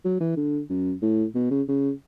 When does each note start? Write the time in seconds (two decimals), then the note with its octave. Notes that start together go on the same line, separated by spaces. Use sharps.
0.05 F#3
0.20 E3
0.37 D3
0.69 F#2
1.02 A2
1.35 B2
1.51 C#3
1.68 C#3